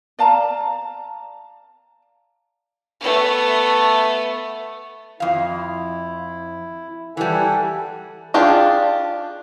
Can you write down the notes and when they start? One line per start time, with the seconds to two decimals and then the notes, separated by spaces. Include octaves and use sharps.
0.19 D5 F5 A5 A#5
3.00 A3 B3
5.20 F2 E4 F5
7.17 E3 G3 A4 F#5 G#5
8.34 D4 F4 G4 G#4